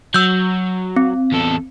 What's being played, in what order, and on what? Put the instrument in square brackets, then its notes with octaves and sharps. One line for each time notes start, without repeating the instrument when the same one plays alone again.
[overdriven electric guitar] F#3 [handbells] E6 G6
[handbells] C4
[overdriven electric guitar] E2 A4